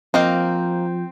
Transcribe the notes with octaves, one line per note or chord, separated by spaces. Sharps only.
F3 A#3 C4 D#5 F5 G5 G6